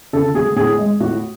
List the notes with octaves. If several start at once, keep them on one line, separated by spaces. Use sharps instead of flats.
C#3 A4
F#3 A3 G#4
A2 G#4
G#3
A2 F#4